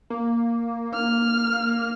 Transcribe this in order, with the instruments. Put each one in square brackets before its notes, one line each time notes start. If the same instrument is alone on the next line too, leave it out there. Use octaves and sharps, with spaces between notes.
[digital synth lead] A#3
[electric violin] F6